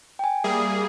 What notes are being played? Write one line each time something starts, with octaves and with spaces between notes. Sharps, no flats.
G5 G#5
G3 A#3 G#4 E5 D#6